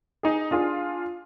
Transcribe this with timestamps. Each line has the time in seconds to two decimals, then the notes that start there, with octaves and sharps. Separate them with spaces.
0.23 D#4 G#4
0.51 D4 F4 G#4